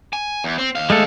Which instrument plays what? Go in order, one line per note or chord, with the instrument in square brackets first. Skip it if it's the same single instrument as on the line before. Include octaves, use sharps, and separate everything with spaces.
[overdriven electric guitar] G#5
E2
C4
D#2 F5
[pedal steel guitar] G#3 A3 A4